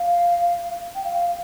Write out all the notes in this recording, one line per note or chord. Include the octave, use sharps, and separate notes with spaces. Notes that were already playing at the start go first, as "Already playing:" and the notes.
Already playing: F5
G5
F5